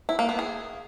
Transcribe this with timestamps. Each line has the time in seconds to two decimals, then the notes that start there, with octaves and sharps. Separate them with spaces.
0.09 E4
0.19 A#3
0.29 B3
0.39 G#4